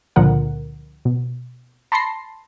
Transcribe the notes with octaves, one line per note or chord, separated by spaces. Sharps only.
C#2 A#2 D3 F3 A#4 F#5
B2
A5 B5 C6 A#6 C7